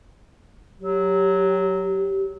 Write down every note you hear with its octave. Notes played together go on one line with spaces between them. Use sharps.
F#3 G4